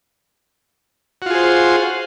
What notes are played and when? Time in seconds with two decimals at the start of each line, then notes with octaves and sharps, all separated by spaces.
1.22 F#4
1.26 F4
1.30 G#4
1.35 C5